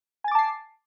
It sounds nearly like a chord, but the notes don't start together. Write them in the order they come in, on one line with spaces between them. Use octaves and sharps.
G#5 A6 D6 A5 C7